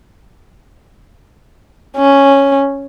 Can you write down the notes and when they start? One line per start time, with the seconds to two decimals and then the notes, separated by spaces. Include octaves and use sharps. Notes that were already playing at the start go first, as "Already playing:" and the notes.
1.97 C#4